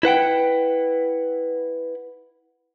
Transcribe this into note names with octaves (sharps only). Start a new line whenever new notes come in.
E4 B4 F#5 G5